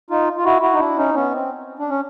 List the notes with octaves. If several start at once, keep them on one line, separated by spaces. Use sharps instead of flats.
D#4 F4
F4
E4 F#4
E4 F#4
D#4
D4 E4
C#4 D#4
B3 C#4
C4
D4
C#4